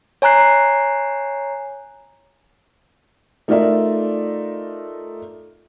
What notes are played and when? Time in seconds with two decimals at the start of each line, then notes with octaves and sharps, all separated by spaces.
0.22 C#5 G#5 A#5 F#6 C7
3.48 A3 D#4 F4 A#4 D5 E5